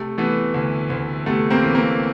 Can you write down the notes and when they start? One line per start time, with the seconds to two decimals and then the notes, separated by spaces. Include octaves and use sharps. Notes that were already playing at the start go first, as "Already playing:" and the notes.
Already playing: C3 A3
0.18 E3 A3 B3
0.54 D2
0.90 D2
1.26 C3 A3 B3
1.50 A#3 C4
1.63 E3
1.75 A#3 C4